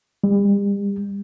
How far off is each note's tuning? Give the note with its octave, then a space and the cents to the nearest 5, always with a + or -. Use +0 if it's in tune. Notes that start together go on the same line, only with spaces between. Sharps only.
G3 +40